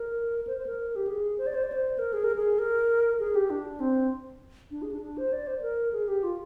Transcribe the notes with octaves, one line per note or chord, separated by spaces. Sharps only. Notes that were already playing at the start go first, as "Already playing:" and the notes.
Already playing: A#4
C5
C5
A#4
G4
G#4
C5
D5
C5
D5
C5
A#4
G#4
A#4
G#4
A#4
G#4
G4
D4
C4
D4
G#4
D4
D4
C5
D5
C5
C5
A#4
G#4
G4
F4